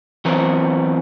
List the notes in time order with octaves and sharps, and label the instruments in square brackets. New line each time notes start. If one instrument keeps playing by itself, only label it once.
[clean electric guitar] E3 F#3 B3 C4 A#4